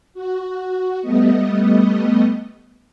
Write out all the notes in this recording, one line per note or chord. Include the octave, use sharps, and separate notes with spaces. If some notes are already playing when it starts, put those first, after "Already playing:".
F#4
G3 A3 B3 D#5